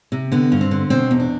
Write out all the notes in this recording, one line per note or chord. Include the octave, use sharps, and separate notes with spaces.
C3
D3 B3
G2
C4
D3
B2 C4
E2
D4